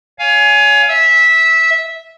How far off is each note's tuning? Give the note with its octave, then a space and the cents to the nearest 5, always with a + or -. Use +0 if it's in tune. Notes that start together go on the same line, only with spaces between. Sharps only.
C#5 +30 F5 +0 G#5 +0
E5 -15 E6 -20